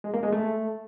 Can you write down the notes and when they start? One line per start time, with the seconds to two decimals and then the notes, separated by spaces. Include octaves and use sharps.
0.04 G#3
0.14 A#3
0.23 G#3
0.33 A3